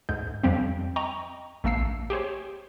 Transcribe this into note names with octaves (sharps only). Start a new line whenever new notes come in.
D2 G#2 G6
F2 F3 G3 C4
D#5 G5 A#5 C#6
A#1 A3 A#3 E6 C7
G4 G#4 C5 C#5